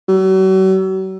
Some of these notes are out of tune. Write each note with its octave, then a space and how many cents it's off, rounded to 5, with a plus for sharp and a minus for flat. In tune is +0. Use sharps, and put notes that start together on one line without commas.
F#3 +40